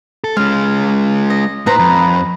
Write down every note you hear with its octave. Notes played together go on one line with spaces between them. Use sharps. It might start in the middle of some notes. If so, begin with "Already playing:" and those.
A4
G#3 C#4 F5
D#5
A2 D#4 B4 C5 A#5
F2